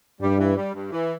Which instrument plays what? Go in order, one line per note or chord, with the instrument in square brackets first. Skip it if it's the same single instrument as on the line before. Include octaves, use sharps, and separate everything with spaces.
[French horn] G2 [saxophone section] G3
[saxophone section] E3
G3
G2
E3